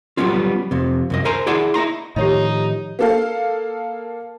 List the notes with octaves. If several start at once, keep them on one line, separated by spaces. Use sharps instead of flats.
F#3 G3 A3 B3 C#4 F4
F2 C3
C2 F#2 D#5
A#4 C5 G#5 A#5 C6
E4 G#4 D5 F#5 A5 C6
E4 D#5 A#5 C6
A2 D#3 F3 D#4 G4 C#5 D#5
A#3 A4 F5